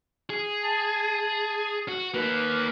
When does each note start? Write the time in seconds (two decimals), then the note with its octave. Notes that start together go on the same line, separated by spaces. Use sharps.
0.30 G#4
0.64 A5
1.88 F#4
2.14 A#3 D#4 B4